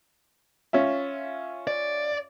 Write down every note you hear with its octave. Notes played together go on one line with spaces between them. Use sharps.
C#4 F4 E5
D5